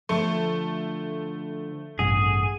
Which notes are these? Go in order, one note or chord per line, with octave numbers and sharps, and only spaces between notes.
D3 F3 A3
A1 G2 C3 G#4 F#5